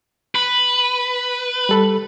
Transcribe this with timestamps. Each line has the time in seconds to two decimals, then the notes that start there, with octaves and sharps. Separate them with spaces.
0.35 B4
1.69 G3 A4 B5